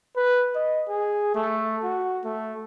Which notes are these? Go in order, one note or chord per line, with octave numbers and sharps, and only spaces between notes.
B4
D#5
G#4
A3
F#4
A3